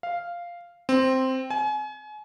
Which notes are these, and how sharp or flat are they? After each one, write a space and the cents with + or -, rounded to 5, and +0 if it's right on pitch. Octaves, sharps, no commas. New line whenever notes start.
F5 -5
C4 +0
G#5 +35